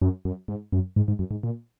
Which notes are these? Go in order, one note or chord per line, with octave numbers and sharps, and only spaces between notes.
F#2
F#2
G#2
F#2
G#2
G#2
F#2
G#2
A#2